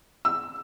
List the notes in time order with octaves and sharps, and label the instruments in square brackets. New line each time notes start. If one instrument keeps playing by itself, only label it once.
[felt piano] E6